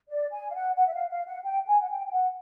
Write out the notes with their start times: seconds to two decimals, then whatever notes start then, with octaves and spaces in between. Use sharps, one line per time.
0.09 D5
0.31 G#5
0.50 F5
0.55 F#5
0.76 F#5
0.87 E5
0.94 F5
1.10 F5
1.27 F#5
1.44 G5
1.67 G#5
1.81 F#5
1.89 G5
2.07 G5
2.11 F#5